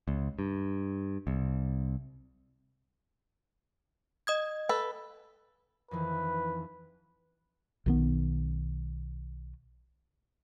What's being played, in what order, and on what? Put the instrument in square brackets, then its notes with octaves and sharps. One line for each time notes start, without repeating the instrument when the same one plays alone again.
[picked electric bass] C#2
G2
C2
[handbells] D#5 D#6 G#6
[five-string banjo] A4 B4
[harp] F2 D#3 E3 [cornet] B4
[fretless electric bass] B1 D#3 B3